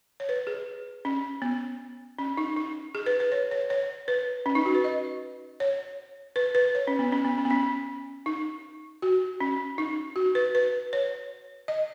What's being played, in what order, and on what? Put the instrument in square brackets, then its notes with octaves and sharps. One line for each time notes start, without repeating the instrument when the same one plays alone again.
[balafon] C#5
B4
G#4
C#4
B3
C#4
D#4
D#4
G#4
B4
B4
C#5
C#5
C#5
B4
C#4
D#4
F#4
B4
D#5
C#5
B4
B4
C#5
C#4
B3
C#4
B3
C#4
B3
C#4
D#4
F#4
C#4
D#4
F#4
B4
B4
C#5
D#5